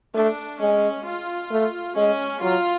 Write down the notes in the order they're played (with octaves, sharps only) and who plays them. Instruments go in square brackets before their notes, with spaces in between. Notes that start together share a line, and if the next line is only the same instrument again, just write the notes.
[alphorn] A3 [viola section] D4
[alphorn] G#3 [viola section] C#4
[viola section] F4
[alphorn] A3
[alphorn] G#3 [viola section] C#4
[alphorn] F#3 [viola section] F4